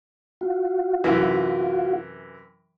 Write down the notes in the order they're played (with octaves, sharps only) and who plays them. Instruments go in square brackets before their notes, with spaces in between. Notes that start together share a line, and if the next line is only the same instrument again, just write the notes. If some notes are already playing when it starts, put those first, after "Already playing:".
[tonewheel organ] F4 F#4
[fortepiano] F#2 C3 E3